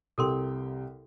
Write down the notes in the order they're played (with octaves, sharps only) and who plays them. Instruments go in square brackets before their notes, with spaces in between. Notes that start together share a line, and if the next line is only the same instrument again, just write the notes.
[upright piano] C2 C3 G5 [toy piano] A4 A#4 C6